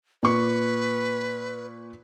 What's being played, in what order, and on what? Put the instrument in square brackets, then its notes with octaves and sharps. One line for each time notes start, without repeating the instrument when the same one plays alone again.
[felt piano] A#2 C#6 [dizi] B4